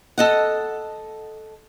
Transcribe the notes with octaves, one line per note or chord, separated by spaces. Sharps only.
A4 D#5 F#5